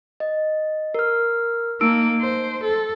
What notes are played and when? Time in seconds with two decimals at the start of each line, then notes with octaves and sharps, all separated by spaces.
0.20 D#5
0.94 A#4 F6
1.81 A#3 D#4 E6 D7
2.21 C5
2.64 A4